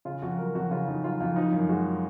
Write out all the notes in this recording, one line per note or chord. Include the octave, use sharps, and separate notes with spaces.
C#3 F4
F2 F#4
F#3 A#4
F2 F#4
C#3 F4
F2 D#4
F#3 F4
F2 F4
F3 D#4
F#2
G#3 F#4